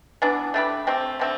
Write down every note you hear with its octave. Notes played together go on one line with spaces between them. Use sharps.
E3 B3 D4
A3 D4 G4 B4
A3 C4 G4
D3 A3 C4